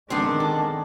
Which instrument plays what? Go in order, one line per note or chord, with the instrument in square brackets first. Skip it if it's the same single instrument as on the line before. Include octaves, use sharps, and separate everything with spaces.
[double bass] D#3 G#3 [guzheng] B3 C4 [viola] D4 [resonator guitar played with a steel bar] C5
[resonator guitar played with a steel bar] A4